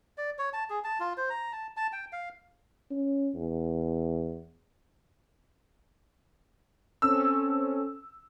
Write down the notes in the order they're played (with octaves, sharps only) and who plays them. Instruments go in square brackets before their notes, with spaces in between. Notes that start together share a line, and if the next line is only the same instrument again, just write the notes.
[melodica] D5
C#5
A5
G#4
A5
F4
C5
A#5
A5
A5
G5
F5
[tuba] C#4
E2
[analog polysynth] C4 C#4 A4 [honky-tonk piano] E6